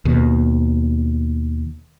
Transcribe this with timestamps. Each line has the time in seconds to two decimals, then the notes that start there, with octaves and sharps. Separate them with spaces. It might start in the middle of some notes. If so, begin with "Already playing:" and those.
0.05 D#2 B2